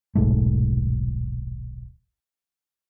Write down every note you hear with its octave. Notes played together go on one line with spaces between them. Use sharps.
D#1 B1 G#2 A3